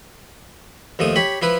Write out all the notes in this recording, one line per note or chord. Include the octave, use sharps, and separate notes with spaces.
D#2 F3 A3 D#6
G4 C#5 B5
F3 E4 B4